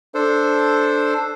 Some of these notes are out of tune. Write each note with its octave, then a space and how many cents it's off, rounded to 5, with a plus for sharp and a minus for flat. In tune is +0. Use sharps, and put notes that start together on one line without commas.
D4 +0 A4 +0 C5 +0